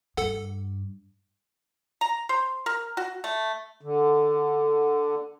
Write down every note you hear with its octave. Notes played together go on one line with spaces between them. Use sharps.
G2 A4 F#5
A#5
C5
A#4
F#4
A3
D3